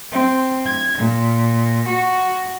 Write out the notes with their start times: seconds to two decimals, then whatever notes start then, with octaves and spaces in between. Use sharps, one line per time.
0.11 C4
0.66 G#6
0.99 A#2
1.87 F#4